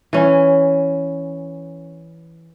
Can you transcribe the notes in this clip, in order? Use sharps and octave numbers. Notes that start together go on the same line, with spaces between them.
E3 C#4